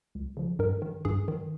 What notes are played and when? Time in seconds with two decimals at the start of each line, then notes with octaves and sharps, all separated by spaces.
0.15 C#2
0.37 C#3 F3
0.59 G2 A#4
0.82 D#3
1.05 G2 G#4
1.28 D#3